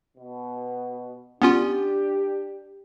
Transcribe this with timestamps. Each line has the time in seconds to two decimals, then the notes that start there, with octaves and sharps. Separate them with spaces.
0.18 B2
1.42 B3 C#4 D4 F4 G4